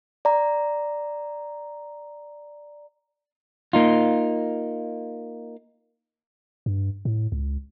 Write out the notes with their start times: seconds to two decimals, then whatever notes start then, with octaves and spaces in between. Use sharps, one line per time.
0.25 D5 A#5
3.73 A#3 D#4 F4
6.66 G2
7.05 A2
7.32 C#2